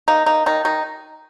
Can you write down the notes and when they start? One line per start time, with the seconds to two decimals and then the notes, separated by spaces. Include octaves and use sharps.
0.08 A#3 D#4
0.26 A#3 D#4
0.46 D#3 D#4
0.65 D#3 D#4